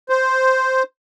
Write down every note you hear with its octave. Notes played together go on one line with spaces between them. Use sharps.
C5